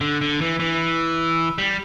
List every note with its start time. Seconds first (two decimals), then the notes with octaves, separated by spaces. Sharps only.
0.01 D3
0.21 D3
0.41 E3
0.60 E3
1.58 G3